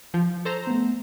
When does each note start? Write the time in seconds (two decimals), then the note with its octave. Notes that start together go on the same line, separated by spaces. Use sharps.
0.14 F3
0.45 A4 C5 A#5
0.67 A3 B3